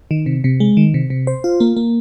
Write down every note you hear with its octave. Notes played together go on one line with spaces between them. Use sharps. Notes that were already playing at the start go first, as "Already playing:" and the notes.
D#3
C3
C3
G#3
D#3
C3
C3
C5
F4
A#3
A#3